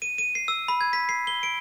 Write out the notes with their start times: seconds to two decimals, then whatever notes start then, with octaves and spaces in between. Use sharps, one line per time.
0.02 D#7
0.18 D#7
0.35 C7
0.48 E6
0.68 B5
0.81 G#6
0.93 B6
1.09 C7
1.27 G7
1.43 D7